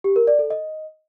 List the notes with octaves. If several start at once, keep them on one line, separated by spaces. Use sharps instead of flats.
G4
A#4
D5
A4
D#5